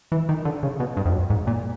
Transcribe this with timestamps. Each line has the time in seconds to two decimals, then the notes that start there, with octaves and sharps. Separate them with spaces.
0.12 E3
0.29 D#3
0.45 D3
0.63 C#3
0.80 B2
0.97 G2
1.05 F2
1.13 F#2
1.30 G#2
1.47 A#2